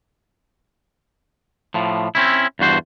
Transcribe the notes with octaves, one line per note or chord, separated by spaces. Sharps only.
A2 F3
C4 C#4 E4
E2 G2 F#4 C5